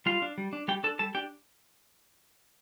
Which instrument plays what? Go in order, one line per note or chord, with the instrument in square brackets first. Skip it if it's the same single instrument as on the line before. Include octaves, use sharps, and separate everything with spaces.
[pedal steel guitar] G3 F4 F5
D4
G3
D4
G3 G4 G5
D4 A4 A5
G3 A4 A5
D4 G4 G5